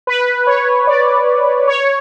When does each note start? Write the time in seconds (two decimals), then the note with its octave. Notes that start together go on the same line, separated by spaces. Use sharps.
0.07 B4
0.47 C#5
0.87 D5
1.68 C#5